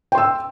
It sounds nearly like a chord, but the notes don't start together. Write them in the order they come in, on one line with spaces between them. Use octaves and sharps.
G5 C6 E6